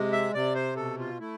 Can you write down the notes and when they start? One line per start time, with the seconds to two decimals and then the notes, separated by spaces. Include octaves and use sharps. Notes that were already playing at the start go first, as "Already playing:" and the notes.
Already playing: C3 G#3
0.12 E5
0.34 C3 D5
0.55 C5
0.76 B2 A4
0.99 F4
1.20 A3 E4